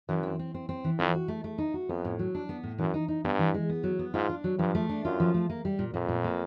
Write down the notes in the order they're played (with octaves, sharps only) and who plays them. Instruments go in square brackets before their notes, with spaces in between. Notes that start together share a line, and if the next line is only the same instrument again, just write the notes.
[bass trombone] F#2 [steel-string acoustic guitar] E3
[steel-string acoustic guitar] C4
C4
C4
C4
E3
[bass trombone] F2 [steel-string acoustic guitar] C4
[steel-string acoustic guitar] F#4
A3
A3
D#4
F#4
[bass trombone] F2 [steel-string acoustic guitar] B3
[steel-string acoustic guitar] A2
F#3
D4
B3
A2
[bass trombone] F#2 [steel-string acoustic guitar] E3
[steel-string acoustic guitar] D#4
D#4
[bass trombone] G2 [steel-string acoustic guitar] B3
[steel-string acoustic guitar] E3
G#3
B3
F#3
B3
[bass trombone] G#2 [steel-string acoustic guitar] F4
[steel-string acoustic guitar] D4
F#3
[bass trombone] G2 [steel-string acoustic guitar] F3
[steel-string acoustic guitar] A3
D4
[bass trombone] F#2 [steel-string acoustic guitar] F4
[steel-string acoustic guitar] F3
A3
A#3
G3
A#2
[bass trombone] F2 [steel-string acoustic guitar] A#2
[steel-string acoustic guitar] A#2
A#3